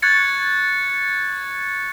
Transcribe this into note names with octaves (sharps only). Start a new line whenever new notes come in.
C#6 F#6 G#6 A6 C#7